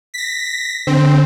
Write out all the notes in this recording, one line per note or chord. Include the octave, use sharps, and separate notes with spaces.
A#6 B6
D3 C4